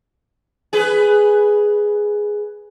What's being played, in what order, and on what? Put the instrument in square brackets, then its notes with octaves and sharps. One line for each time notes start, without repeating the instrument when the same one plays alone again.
[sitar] G#4 B4